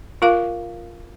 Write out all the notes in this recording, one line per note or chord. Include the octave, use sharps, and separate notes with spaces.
F4 A#4 F5 D6